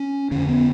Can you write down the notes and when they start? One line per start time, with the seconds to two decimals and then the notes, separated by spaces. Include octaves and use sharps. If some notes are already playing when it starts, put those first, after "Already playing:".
Already playing: C#4
0.31 F2 D3 C#4
0.49 B3